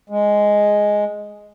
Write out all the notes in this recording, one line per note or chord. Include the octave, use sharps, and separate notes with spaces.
G#3